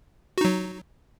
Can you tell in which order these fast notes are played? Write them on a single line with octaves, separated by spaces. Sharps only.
F#4 D#4 F#3